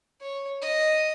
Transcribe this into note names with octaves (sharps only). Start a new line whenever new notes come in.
C#5
D#5